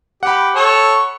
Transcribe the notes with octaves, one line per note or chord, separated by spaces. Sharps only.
G4 F#5 B5
A4 C#5